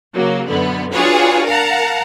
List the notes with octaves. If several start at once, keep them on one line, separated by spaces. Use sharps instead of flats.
C#3 F#3 A#3
F#2 B2 D3 B3
D4 F4 F#4 G#4 B4 C#5
A#4 F5 F#5 A5 A#5